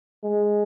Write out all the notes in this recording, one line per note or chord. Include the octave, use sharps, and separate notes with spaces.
G#3